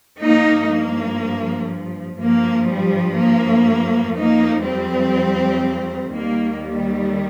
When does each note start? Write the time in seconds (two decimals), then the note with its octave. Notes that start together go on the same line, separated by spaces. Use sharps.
0.22 G2 F3 A#3 D#4
0.72 A#3
2.19 G2 F3 A#3
2.69 G3
3.18 A#3
4.16 F2 F3 A#3 D#4
4.66 G3 C4
6.14 D#2 D#3 G3 A#3
6.64 G3